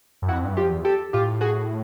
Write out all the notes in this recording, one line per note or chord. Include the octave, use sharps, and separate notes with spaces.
F#2
F2 E4 F#4
G2
F#2 F4 G4
F2
E2
G4 A4
A2 F4 G4
F#4 G#4